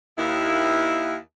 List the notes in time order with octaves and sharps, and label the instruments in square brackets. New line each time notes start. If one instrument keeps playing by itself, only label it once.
[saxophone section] D#2 E4